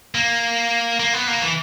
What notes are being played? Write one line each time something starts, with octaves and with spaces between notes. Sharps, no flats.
A#3
A#3
B3
A#3
E3